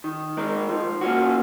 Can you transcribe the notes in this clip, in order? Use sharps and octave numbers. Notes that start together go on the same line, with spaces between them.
D#3
G#3 D#4 A#4
F3
A#3 C#4 F#4